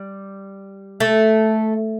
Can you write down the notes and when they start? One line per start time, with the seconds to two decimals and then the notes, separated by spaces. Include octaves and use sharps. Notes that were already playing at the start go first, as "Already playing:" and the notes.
Already playing: G3
1.00 A3